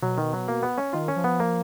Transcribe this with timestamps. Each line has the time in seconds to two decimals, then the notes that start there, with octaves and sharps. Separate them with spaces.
0.02 B2 F#3
0.18 D#3
0.33 F#3
0.48 A#3
0.63 B3
0.78 C#4
0.93 D#3 F4
1.08 C#4
1.16 F3
1.24 B3
1.40 A#3